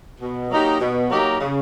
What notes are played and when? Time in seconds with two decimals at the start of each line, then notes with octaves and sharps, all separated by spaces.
0.20 B2
0.49 F#3 A#3 D#4 G4
0.79 B2
1.10 F#3 A#3 D#4 G4
1.40 C#3